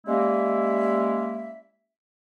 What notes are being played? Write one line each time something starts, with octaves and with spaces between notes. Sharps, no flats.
G3 G#3 A#3 C#4 E4 E5